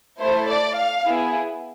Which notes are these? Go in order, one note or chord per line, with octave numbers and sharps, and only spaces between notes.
A3 E4 A4 C5
D5
F5
B3 E4 G#4